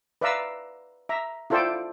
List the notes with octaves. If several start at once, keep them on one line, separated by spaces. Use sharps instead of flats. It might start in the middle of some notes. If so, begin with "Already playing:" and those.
B4 D5 E5 F5 A#5 E6
E5 A#5
E4 F4 A4 C5 D5 G5